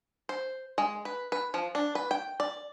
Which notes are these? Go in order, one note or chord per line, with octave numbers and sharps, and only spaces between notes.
C5
G#3
B4
B4
F3
D4
B4
G5
D5